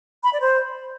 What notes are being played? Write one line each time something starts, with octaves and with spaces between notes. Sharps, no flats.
B5
D5
C5